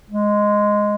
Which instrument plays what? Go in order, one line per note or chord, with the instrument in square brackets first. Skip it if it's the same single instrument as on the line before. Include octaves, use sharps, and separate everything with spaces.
[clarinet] G#3